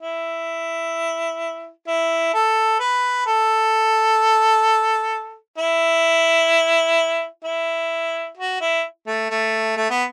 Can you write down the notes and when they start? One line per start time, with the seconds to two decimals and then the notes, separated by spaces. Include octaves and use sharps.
0.02 E4
1.87 E4
2.34 A4
2.80 B4
3.26 A4
5.58 E4
7.45 E4
8.37 F#4
8.61 E4
9.07 A3
9.30 A3
9.77 A3
9.90 B3